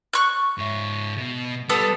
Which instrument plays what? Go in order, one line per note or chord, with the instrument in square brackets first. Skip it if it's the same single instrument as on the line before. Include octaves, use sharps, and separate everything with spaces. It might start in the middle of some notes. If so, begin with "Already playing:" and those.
[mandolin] C#6 F#6
[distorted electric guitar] G#2 E5
B2
[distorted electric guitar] G3 [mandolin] B3 A4 D#6